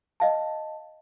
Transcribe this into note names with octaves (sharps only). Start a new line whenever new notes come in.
D#5 F5 A5